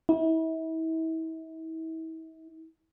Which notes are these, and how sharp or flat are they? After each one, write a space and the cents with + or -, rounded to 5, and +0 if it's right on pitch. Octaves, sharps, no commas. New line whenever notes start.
E4 -40